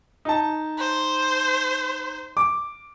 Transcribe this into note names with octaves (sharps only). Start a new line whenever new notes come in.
D#4 A5
C5
D6